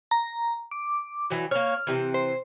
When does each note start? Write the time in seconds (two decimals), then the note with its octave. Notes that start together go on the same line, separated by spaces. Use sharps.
0.11 A#5
0.71 D6
1.30 E3 F#3
1.51 A#3 C#5 F6
1.87 C3 E3
2.14 C5